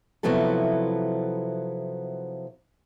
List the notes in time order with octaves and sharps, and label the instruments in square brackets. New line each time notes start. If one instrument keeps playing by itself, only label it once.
[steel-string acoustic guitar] C3 F3 F#3 B3 E4 A4